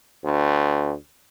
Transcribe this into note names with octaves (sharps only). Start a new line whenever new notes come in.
D2